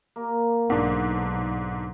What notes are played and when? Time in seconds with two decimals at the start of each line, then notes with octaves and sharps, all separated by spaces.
0.16 A#3
0.70 B1 G#2 D4